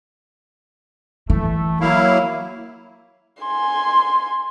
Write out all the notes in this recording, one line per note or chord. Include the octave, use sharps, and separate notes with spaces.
E3 A3
F#3 A#3 E4 F5
G#5 C6